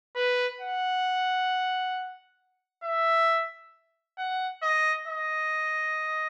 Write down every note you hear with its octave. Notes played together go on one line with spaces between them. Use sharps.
B4
F#5
E5
F#5
D#5
D#5